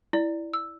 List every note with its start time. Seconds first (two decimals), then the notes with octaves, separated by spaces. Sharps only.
0.13 E4 D5
0.53 E6